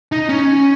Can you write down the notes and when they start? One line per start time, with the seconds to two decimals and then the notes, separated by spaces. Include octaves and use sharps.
0.12 D#4
0.29 C#4